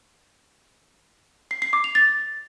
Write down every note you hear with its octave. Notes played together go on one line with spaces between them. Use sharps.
C7
C7
D6
F7
A6